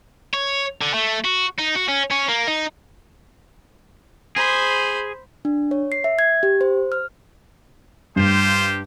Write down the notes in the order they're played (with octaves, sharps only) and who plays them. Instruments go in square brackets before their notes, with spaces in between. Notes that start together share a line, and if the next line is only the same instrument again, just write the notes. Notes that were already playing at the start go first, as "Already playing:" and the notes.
[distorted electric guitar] C#5
D3
A3
F#4
D#4
F#4
C#4
C#4
A#3
D#4
[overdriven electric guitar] G#4 [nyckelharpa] C5 B5
[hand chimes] D4
C#5
C7
E5
G#6
G4
C5
F6
[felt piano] G2 [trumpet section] F4 G4 C5